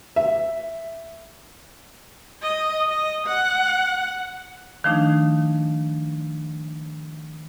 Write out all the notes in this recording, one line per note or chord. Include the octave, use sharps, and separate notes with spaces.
E5
D#5
D#5
F#5
D#3 F3 A3 D4 D#4